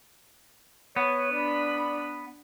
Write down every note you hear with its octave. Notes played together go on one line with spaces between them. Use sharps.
B3 C#5
D4 D5 B5